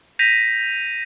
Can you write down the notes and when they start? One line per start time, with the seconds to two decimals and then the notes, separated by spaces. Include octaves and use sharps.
0.19 G6 A#6 B6 D#7 F7